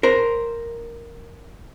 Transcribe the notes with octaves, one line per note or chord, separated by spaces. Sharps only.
A#4 C5